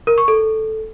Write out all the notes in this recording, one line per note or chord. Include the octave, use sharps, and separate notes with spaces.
A#4
C#6
A4